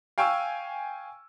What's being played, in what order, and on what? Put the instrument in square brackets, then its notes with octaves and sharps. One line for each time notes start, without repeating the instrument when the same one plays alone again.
[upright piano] F5 G5 G#5 C#6 E6